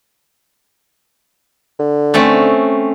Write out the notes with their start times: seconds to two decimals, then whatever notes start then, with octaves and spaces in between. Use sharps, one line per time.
1.80 D3
2.14 A3 C4 C#4